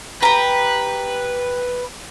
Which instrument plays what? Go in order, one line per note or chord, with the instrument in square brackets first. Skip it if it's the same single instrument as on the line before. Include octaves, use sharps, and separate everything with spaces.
[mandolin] G4 A#5 [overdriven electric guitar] B4